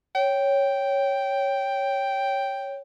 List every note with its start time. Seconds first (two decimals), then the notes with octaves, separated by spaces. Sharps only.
0.15 C#5 G5